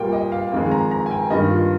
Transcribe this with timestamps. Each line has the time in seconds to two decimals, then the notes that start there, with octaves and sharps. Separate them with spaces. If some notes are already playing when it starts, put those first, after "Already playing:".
Already playing: A#2 G3 A#3 G5
0.13 D#5
0.32 F5
0.52 F2 D#3 G#3 F5
0.71 A#5
0.91 A#5
1.06 G#5
1.11 G5
1.30 G2 D#3 A#3 D#5
1.49 F4